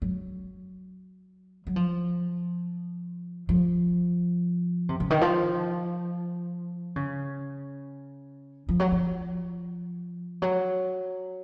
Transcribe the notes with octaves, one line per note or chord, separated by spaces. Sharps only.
F#3
F#3
F3
F3
C3
C#3
D#3
F3
C#3
F3
F#3
F3
F#3